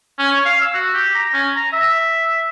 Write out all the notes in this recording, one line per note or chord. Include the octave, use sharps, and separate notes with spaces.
C#4
C#5
F5
E6
F#4
G4
A#5
C#4
A#5
E5